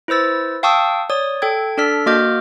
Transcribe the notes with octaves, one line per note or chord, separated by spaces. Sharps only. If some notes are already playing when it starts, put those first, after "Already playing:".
E4 B4 C5 E6 A6
F5 G5 A5 C#6 D#6 E6
C#5 D5 D#6
A4 G5 G#6
D4 A4 D5 F6 B6
A#3 F#4 D#5 D6 F6 G6